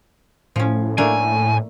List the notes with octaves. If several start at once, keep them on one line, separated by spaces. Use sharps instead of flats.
A2 F3 C#4
A3 A#3 D4 G#5